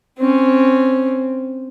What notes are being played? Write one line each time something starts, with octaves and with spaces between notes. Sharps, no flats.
C4 C#4